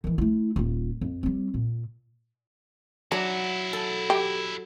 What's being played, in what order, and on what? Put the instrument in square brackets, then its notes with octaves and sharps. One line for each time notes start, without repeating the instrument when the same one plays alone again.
[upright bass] D#3 E3
A3 E4
D#1 F4
F2
G3 C4
A#2
[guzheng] F#3 [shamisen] D4 [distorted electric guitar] E4 F#4
[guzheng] A4
[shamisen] G4